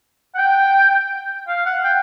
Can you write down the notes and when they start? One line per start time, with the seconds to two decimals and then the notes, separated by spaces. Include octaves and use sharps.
0.35 F#5
0.38 G5
1.48 F5
1.66 F#5
1.84 G5